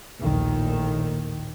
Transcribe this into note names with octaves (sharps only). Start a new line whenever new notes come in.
A#1 D#2 A2 D#3